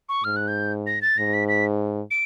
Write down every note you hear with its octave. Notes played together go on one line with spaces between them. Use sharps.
C#6
G#2 F6
F#6
G6
A#6
A6
G#2 A#6
B6
B6
D7